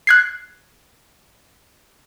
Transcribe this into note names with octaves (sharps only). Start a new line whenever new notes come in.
F#6 G#6 C7